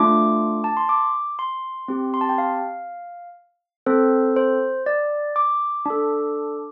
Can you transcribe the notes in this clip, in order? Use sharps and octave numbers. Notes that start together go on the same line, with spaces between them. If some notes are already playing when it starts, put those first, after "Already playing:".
Already playing: A3 D4 F4 D6
A5
C6
D6
C6
C4 G4
C6
A5
G5
F5
C4 A4 C5
C5
D5
D6
D4 A4